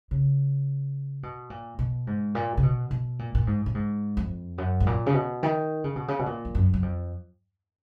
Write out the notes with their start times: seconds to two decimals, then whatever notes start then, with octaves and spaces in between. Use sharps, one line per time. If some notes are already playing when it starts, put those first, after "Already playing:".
0.11 C#3
1.23 B2
1.50 A#2
1.79 B2
2.07 G#2
2.35 A#2
2.57 C#3
2.63 B2
2.91 B2
3.19 A#2
3.35 A#2
3.47 G#2
3.66 A#2
3.74 G#2
4.17 F2
4.58 F#2
4.80 G#2
4.87 A#2
5.06 C#3
5.14 B2
5.43 D#3
5.84 C#3
5.96 B2
6.08 C#3
6.19 B2
6.26 A#2
6.45 F2
6.55 F#2
6.74 F#2
6.82 F2